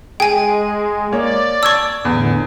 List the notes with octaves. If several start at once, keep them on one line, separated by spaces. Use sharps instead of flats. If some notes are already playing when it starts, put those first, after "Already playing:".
G#3 G#4 G5 G#5
A#3 C#5 D5
A5 C#6 E6 G#6 A6
E2 A2 D3